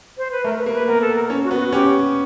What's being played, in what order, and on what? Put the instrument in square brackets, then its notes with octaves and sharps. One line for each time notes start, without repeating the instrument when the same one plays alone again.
[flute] C5
B4
[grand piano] A3 [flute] A#4
[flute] B4
[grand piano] A#3
[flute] B4
[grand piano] B3 [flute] A#4
[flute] A4
A#4
[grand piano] C#4
[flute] F#4
[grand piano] B3
[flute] F#4
[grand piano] C#4 [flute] G4